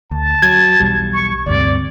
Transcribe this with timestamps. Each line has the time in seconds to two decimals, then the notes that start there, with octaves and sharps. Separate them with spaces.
0.11 D2 A5
0.42 F#3 G#6
0.80 B1 E2 G3
1.13 C#6
1.47 D2 G2 C3 D5